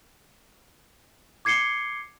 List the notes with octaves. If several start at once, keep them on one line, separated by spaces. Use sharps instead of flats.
D6 G#6 C7 C#7 G7